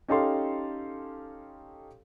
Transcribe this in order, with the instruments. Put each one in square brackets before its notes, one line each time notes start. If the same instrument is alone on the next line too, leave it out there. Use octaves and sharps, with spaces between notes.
[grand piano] C#4 D#4 G4 A4 F5 C6